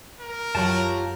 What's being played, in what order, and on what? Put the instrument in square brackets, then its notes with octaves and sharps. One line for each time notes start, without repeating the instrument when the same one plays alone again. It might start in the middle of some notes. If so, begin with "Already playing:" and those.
[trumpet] A#4
[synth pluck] F#2 A#5 [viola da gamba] F#3 [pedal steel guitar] F4 G4 A5